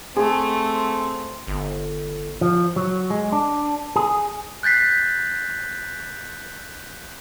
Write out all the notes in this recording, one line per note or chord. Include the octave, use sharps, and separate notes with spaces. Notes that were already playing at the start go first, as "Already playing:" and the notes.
A3 C4 G#4
G1
F3
F#3
G#3
D4
G#4
F#6 G6 A6 B6 C7